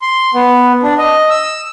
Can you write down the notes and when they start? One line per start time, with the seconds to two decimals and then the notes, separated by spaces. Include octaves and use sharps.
0.02 C6
0.34 B3
0.83 D4
0.98 D#5
1.30 E6